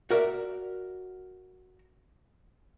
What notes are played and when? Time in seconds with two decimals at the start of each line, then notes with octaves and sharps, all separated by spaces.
0.10 F#4 A#4 D5 E5